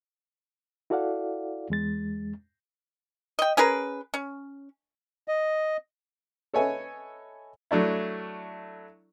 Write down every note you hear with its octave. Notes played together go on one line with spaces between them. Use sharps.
E4 F#4 A4 D5 F5 F#5
E2 G#3 A6
D#5 G5
C#4 G#4 A#4 B4
C#4
D#5
A4 B4 C#5 D#5 E5 G#5
F#3 A3 D4 E4